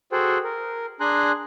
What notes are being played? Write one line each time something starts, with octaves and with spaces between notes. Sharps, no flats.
F#4 G#4 A4 C5 F#5 G5
A#4
D4 G#4 G#5 A#5 C6 F#6